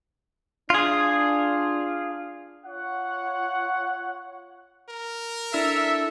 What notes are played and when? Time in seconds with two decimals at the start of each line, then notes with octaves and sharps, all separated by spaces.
0.70 D4 F4 G#4
2.65 F4 C#5 F#5
4.90 A#4
5.54 D4 E4 A4 E5 E6